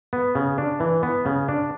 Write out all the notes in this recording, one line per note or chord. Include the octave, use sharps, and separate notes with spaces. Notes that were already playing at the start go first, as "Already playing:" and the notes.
B3
C#3
D4
E3
B3
C#3
D4